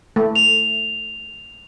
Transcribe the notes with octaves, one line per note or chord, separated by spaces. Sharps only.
A3
F7